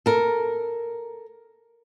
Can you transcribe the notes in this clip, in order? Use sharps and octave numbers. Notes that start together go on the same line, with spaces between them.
A4 A#4